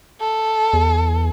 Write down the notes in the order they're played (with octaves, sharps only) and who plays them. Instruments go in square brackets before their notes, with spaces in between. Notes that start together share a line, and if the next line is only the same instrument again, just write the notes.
[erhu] A4
[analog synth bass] E2